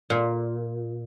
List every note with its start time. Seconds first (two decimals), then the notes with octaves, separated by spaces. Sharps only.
0.10 A#2